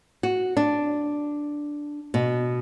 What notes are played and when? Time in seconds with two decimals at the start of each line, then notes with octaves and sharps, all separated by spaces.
0.23 F#4
0.57 D4
2.14 B2